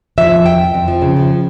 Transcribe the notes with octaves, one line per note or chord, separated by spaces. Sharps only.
F3 E5
F2
F2 G5
F2
F2
F3
C#3
F3